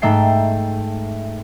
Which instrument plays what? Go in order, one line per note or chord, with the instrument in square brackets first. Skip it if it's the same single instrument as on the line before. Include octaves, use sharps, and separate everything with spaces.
[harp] G#2 A3 E5 G5 C7